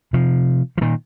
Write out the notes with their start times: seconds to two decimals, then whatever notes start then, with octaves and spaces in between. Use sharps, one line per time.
0.13 C3 F3
0.77 F3
0.81 A#2 D#3